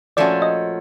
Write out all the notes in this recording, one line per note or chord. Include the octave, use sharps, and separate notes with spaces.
A#2 F3 A3 C#4 F#4 D5
D#5